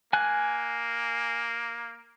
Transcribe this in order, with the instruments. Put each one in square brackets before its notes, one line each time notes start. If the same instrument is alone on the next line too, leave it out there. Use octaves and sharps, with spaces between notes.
[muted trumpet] A#3 [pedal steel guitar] G#5 F#6